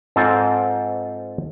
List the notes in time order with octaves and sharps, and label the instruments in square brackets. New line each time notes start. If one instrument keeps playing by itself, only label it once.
[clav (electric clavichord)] G#2 C4 F4 A4 G5